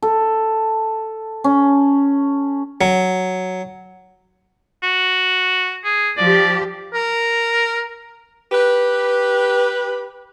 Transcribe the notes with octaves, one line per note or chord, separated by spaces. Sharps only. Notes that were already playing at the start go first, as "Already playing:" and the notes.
A4
C#4
F#3
F#4
G#4
F3 G4 D5
A#4
G4 B4